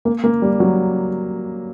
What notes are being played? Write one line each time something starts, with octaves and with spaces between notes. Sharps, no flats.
A#3
A#3
G3
F#3